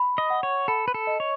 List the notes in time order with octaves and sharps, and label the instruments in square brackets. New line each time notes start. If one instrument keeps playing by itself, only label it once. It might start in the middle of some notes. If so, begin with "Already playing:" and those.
Already playing: [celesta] B5
[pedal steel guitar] D#5
[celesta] F#5
[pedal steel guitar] C#5
[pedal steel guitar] A4 [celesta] B5
[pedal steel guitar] B4
A4
[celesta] D#5
[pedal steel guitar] C#5